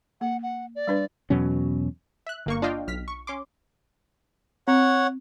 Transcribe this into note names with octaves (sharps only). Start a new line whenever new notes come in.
A#3 F#5
F#5
D5
G3 D4 B4
E2 B2 F#3 C#4
E5 F#6
G1 A#3 C#6
D4 F4 D#5 F5 G5
B1 F6 B6
C#6
C#4 C6 D6
C4 C#5 F#5